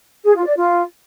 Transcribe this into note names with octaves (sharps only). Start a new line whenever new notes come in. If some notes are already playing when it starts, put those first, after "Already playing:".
G#4
F4
D5
F4